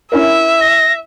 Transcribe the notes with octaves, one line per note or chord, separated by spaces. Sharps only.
C#4 E4 A#4 E5
A#6